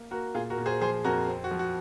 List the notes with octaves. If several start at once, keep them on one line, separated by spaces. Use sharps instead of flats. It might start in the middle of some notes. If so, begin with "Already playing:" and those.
Already playing: A#3
A#3 F#4 A#4
A#2 F4 G#4
F#4 A#4
A#2
G#4 C5
F3 G#4 C5
F2 F#4 A#4
C4
F#4
F3
F#4